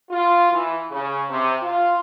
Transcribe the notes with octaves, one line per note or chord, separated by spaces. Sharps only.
F4
E3
C#3
C3
F4